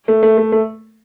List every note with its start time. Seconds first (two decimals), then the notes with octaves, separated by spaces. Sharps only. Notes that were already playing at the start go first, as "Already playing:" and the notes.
0.08 A3
0.23 A3
0.38 A3
0.52 A3